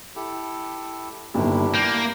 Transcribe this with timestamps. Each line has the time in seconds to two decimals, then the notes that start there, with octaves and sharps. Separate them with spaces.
0.16 E4 G4 A4
1.34 G1 D#2 D4 E4 G4
1.74 A#3 G6